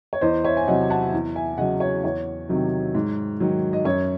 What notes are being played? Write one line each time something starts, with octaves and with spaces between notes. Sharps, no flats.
C#5
E2 C5 D#5
C#5 E5
G#5
C3 F#3 D#5 F#5
F#5 A5
E2
E5 G#5
C#3 F#3 D#5 F#5
C#5
E2 C#5
C3 D#3 F#3
G#2
D#3 F#3
D#5
F#2 C#5